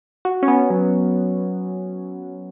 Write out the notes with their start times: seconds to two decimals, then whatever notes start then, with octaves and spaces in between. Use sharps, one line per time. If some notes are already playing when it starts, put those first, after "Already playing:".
0.25 F#4
0.43 C#4
0.48 B3
0.70 F#3